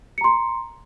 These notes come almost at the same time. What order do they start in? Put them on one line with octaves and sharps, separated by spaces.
C#7 A#5 C6